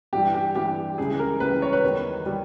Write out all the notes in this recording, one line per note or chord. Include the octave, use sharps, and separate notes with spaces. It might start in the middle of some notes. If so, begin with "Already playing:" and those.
G2 E3 G3 G4
G4
G2 E3 G3 G4
C#2 C#3 E3 G3 G#4
A#4
C#2 C#3 E3 G3 B4
C#5
B4
E2 D#3 G3
D#3 G3